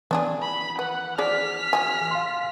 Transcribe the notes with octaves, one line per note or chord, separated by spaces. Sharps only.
E3 B3 D4 G#4
B5
B4 F#5
F3 G#4 D5 F6 B6
F#3 G#4 G#5
F5 C6